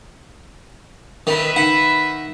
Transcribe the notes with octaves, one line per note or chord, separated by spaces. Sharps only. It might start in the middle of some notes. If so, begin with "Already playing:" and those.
D#3 B4 E5
D#3 F#5 B5